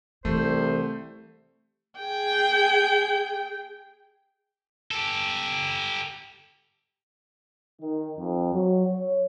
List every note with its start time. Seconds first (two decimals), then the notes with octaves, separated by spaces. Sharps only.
0.25 C2 E3 A3 C5
1.98 G#4 G5
4.91 G4 A4
7.81 D#3
8.17 F2
8.53 F#3
8.86 C#5